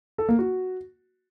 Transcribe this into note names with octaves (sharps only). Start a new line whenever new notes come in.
A4
A#3
F#4